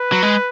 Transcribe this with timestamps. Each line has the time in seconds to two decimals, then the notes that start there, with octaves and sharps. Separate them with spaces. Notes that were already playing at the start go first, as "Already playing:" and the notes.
Already playing: B4
0.12 F#3
0.23 G#3